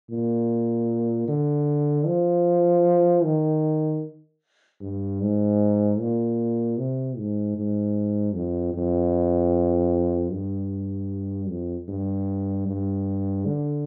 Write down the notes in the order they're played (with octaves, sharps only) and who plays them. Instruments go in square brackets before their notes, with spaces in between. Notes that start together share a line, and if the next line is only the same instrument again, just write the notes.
[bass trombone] A#2
D3
F3
D#3
G2
G#2
A#2
C3
G#2
G#2
F2
F2
G2
F2
G2
G2
D3